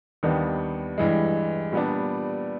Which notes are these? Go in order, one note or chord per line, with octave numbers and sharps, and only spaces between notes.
D#2 D#3 G3 B3 D4
G2 E3 G#3
A#2 G3 B3 D4